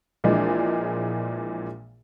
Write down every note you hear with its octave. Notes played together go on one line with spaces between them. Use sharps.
A#1 A#2 E3 F3 G#3 D4